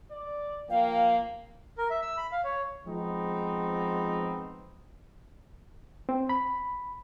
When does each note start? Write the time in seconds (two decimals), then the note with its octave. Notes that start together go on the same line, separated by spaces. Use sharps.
0.11 D5
0.69 F3 A#3 F5 G5
1.78 A#4
1.90 E5
2.02 E6
2.17 B5
2.32 F5
2.44 C#5
2.86 F3 G#3 B3 C4 D#4
6.09 C4
6.29 B5